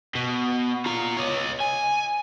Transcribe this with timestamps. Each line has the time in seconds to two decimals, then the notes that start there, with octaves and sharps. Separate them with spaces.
0.15 B2
0.86 F4 A#5
1.17 C#5 D#5
1.61 G#5